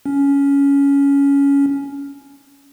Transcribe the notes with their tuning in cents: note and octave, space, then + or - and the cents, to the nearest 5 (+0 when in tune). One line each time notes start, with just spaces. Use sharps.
C#4 +15